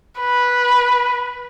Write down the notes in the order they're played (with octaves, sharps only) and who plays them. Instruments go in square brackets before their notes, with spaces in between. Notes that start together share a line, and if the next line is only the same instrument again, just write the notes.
[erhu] B4